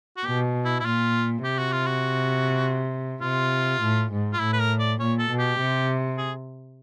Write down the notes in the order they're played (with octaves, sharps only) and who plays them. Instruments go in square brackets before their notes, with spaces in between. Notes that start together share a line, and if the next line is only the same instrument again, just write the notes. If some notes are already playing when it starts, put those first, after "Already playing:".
[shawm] F#4
[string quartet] B2 [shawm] G4
[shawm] E4
E4
[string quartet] A#2 [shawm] F4
[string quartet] C3 [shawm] G4
[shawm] F#4
F4
F#4
[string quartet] C3 [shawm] F4
[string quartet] A2
G#2
[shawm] F4
[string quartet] A2 [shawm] E4
[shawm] B4
A#4
D5
[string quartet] A#2 [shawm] C#5
[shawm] A4
[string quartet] B2
[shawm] G4
[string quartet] C3
[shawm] G#4